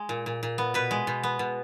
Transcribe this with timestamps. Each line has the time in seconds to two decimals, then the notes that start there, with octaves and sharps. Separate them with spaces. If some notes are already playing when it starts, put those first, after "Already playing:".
Already playing: G#3
0.09 A#2
0.26 A#2
0.43 A#2
0.58 B3
0.74 B2 B4
0.91 G#3
1.07 B2
1.23 B3
1.39 B2